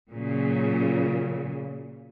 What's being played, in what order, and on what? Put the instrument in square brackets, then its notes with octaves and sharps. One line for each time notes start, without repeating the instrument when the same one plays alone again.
[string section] A#2 C#3 F#3